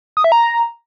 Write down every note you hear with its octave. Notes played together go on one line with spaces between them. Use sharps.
D#6
E5
A#5